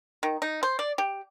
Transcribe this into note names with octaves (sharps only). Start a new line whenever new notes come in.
D#3
D#4
C5
D5
G4